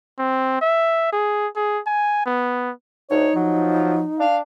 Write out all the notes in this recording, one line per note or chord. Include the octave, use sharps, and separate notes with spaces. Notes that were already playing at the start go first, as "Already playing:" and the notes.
C4
E5
G#4
G#4
G#5
B3
D2 D#4 C#5
F3 F#3
D4 F5